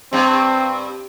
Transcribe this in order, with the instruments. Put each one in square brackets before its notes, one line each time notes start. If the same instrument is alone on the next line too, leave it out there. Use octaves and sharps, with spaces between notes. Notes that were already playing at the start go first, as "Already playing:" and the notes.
[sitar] G2 [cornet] C4